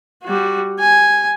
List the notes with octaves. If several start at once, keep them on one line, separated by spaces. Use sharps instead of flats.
G3 F#4
G#5